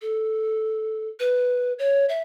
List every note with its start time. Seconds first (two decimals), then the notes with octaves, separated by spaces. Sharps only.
0.02 A4
1.20 B4
1.79 C#5
2.09 E5